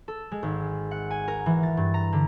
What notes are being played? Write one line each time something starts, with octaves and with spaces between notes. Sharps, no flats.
A4
G#3
G#1
F#5
G#5
A#4
E3
A6
G2
A#5
D3